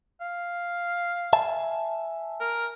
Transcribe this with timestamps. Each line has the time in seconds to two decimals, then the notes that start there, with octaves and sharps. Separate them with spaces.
0.21 F5
1.33 E5 G#5 A5
2.40 A#4